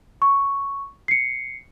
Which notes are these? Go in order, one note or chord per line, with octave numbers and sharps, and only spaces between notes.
C#6
C7 C#7